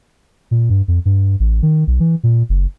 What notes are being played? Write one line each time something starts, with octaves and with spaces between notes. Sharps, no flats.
A#2
G2
F2
G2
A1
D#3
B1
E3
A#2
F#1